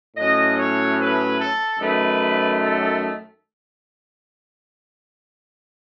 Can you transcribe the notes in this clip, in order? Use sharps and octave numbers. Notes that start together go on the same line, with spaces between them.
A2 F#3 C#4 D#5
C#5
B4
A4
F#2 D#3 A3 B4
A4